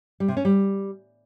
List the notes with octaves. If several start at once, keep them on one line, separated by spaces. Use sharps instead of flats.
G3
C3
C#4
G3